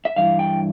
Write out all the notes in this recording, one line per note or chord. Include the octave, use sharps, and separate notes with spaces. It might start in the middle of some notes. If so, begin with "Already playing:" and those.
E5
G2 E3 E4 F5
G5